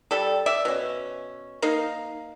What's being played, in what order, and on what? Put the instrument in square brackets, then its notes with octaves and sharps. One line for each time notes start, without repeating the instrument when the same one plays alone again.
[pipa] G3 A4
D5 E5
B2 C#4
A#3 D#4 F5